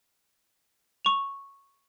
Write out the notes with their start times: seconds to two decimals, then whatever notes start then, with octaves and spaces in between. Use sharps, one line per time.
1.05 C#6 F7